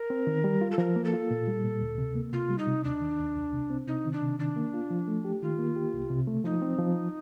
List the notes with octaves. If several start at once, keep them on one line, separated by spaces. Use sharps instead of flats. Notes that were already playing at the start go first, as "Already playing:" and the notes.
Already playing: A#4
C4
D#3
G3
F4
A4
F3 A#4
A#3
A4
F4
A#2
G3
A#2
D2
C3
A#3
C3 F4
G3
D#4
C3
D#2 D4
D#3
D#2
C2
C3
C4
C3 D#4
D#3
D4
C3
D#3 D4
A#3
F4
F3
A3
G4
D#3 F4
A#3
G4
C2
C3
A3
F3 D#4
C4
F3